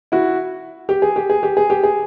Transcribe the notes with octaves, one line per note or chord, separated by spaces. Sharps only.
E4 F#4
G4
G#4
G4
G#4
G4
G#4
G4
G#4